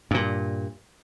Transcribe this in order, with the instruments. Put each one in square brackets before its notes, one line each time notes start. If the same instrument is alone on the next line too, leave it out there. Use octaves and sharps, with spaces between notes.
[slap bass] G2 A#2